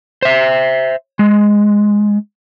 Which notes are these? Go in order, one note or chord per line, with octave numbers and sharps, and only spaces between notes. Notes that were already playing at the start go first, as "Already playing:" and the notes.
C5 E5
G#3